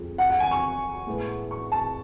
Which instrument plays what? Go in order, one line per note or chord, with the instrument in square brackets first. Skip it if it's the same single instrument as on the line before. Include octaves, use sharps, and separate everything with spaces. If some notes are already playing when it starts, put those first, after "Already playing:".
Already playing: [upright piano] F2 F3 G#3
[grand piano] F#5
F#5
G#5
C#6
[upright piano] A2 G#3 B3
[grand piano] C#6
A5